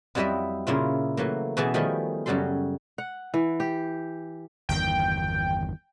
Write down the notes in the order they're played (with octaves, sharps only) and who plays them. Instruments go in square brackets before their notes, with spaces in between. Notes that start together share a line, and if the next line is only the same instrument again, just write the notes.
[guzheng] F2 F#3 G3 E4 D#5 E5
A#2 C#3 E4 F4
E3 F#3 A3 A#3
B2 E3 B3 G#4 A5
D#3 F3 G3 A3 G#4 D#5
F#2 C#3 F#3 G3 A4 C6
[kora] F#5
E3
G4
[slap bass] G1 E2 D#3 [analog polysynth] G5